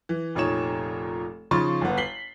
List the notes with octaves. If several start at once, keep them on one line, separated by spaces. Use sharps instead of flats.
E3
F1 A#2 D#4 C#5 E7
C#3 F3 D#4 C6 C#6 A6
G1 B3
B6 C7 F#7 G7